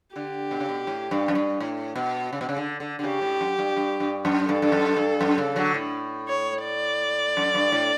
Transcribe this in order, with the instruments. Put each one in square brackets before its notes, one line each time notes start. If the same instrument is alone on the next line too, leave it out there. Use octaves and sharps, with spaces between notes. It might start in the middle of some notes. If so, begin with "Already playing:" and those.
[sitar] D3 [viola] G4
[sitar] B2
C#3
B2
A2
G2
F#2
G2
A2
B2
C#3
B2
C#3
D3
D3
D3
[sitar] C#3 [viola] G4
[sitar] A2
F#2
G2
G2
G2
F#2
[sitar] G2 [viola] A4
[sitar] G2
F#2
G2
F#2
C#3
D3 F#3
A2
[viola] C#5
D5
[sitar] F#2
G2
A2